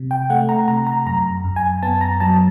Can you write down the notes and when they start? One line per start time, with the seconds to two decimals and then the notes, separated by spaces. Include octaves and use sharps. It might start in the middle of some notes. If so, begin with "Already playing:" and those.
Already playing: C3
0.11 G5
0.30 A3 F#5
0.49 A#5
0.68 C3 A#5
0.87 A#5
1.06 F#2 A#5
1.44 F#2
1.56 G#5
1.83 B3 A5
2.01 A#5
2.20 F#3 A5